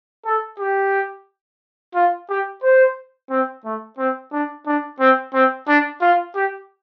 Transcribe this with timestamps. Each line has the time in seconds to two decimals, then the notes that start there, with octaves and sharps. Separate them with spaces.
0.26 A4
0.59 G4
1.95 F4
2.30 G4
2.64 C5
3.30 C4
3.65 A3
3.98 C4
4.33 D4
4.67 D4
5.00 C4
5.34 C4
5.68 D4
6.02 F4
6.35 G4